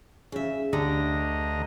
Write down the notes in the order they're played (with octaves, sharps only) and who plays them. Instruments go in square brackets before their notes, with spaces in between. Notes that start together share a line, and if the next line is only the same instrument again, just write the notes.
[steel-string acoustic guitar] C#3 E5
[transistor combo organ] D2 D#5 A#5 [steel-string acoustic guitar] D3 G4